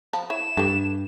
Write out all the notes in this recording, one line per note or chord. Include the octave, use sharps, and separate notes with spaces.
F3 A5 B5
E4 C#5 E7
G2 G4 A4